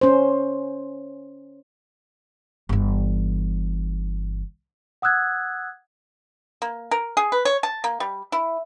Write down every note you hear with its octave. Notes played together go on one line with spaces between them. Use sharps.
C#4 C5
G1 E3
F#5 D#6 E6 F#6 G#6
A#3
A#4
G#4
B4
C#5
A5
A#3
G3
E4